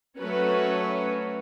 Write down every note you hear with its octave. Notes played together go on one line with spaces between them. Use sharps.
F#3 A3 C#4 F#4 B4 C#5